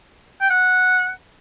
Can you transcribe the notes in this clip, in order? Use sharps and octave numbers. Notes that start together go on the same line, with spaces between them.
G5
F#5